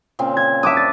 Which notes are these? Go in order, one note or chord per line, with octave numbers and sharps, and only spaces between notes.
A#2 C#3 C4
G#6
D4 E5 D6 D#6
A6